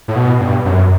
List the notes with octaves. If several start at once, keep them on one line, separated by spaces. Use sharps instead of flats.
A2
B2
G2
F#2